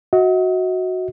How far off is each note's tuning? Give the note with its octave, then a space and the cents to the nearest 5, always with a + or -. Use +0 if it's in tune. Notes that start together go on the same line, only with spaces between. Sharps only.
F#4 -5 D#5 +45